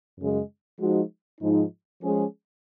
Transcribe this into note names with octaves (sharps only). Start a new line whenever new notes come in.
F#2 C#3 G#3
F3 G#3 D#4 F#4
G#2 F3 G#3 D#4
F3 G#3 C#4 G#4